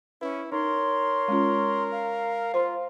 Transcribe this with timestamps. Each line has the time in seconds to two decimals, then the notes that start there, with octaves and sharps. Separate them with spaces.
0.21 C#4 E4 B4
0.52 D#4 A#4 C#5 C6
1.28 G#3 C#4 F4
1.92 F5
2.54 F4 C5 C6